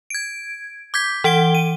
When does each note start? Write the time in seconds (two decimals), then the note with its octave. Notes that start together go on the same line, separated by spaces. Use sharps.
0.10 G#6 D7
0.94 D6 G6 G#6 B6
1.24 E3 F#5 D7 G7
1.54 D#7